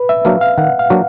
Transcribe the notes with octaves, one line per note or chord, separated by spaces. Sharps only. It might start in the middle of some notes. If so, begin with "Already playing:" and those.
Already playing: B4
E5
F#3 A#3 D4 F#4 F5
F5
D#3 F#5
F5
F#3 A#3 D4 F#4